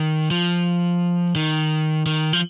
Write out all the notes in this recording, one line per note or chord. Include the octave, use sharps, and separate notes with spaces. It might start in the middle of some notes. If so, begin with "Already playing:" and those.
Already playing: D#3
F3
D#3
D#3
F3